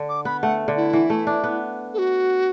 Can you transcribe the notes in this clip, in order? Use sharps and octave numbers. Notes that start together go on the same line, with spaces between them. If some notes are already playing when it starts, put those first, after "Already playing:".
Already playing: D3
D6
B3 B5
A3 F#5
D3
E4
E3
A3
D4
B3
A4
F#4